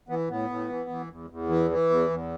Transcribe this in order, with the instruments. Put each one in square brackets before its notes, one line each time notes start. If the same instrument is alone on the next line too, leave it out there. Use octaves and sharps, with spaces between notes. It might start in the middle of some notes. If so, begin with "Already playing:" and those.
[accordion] E3 B3
A2 B3
A2
E3
E3
E2
E2
E3
E3
E2
E2